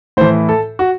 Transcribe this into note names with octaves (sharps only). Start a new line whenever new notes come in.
A2 E3 C5
A4
F#4